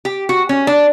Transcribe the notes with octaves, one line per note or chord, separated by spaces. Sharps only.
G4
F#4
C#4
D4